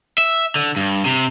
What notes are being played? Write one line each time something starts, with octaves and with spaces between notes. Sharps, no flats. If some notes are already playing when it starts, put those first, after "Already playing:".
E5
D3
G2
C3